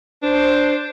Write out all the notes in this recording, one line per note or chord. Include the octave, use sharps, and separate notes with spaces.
D4 C5